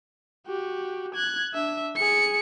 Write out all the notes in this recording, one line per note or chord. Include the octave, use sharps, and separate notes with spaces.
F#4 G4
F#6 G#6
D4 E5
G#4 C#7